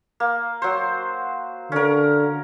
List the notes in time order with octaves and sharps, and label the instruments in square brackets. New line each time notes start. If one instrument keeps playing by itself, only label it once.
[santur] A#3
F#3 C5
[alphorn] D3 [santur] C#4 A#4